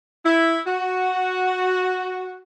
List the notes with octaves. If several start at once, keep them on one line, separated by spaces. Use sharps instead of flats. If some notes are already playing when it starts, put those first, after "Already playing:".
E4
F#4